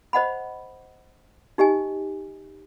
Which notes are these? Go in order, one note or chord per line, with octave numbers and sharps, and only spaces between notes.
C5 D#5 F#5 B5
D#4 G4 D#5 G#5